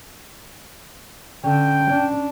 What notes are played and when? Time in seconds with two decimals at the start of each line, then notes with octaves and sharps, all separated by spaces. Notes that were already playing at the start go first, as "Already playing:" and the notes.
1.44 D3 C#4 G5
1.92 D4